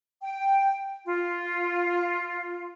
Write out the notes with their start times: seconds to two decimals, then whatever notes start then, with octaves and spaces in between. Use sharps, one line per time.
0.23 G5
1.06 F4